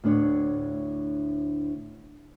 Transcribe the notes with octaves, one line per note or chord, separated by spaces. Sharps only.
D2 A2 D4 C#5